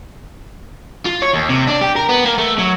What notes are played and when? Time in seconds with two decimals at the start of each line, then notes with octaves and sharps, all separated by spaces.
1.06 F4
1.22 C#5
1.34 D#2
1.49 C3
1.68 D4
1.81 G4
1.96 A#4
2.09 B3
2.25 A#3
2.38 A3
2.59 F#3